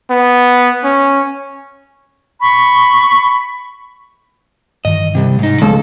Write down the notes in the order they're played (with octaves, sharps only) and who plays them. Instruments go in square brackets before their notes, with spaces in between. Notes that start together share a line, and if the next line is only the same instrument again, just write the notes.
[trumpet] B3
C#4
[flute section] B5 C#6
[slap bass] G2 D#3 E3 [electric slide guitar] D#5
[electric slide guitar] C3 G3
[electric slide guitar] G#2 D#4 [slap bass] C3
[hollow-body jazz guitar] C#2 [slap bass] F3 F#3 A3 [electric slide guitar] A4